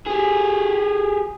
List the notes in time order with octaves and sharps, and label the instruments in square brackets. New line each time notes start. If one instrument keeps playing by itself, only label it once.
[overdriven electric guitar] G4 G#4